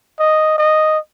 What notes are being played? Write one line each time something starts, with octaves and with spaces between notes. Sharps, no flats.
D#5
D#5